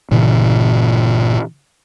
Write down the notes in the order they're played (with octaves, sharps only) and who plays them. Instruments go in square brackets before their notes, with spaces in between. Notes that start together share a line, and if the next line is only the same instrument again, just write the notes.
[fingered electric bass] G1 A#2 C#3 E3